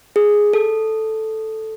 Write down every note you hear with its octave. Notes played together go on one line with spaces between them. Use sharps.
G#4
A4